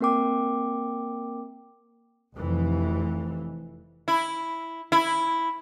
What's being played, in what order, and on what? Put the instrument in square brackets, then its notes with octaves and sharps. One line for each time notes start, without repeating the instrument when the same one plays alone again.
[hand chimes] A#3 C4 A#4 G5 D6
[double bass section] F1 F2 E3
[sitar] E4
E4